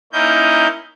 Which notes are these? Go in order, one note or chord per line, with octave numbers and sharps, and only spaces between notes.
A#3 C#4 D#4 E4 D#5 G6